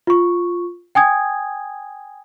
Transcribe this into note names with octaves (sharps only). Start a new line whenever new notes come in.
F4 C#6
G5 G#5 D#6 G#6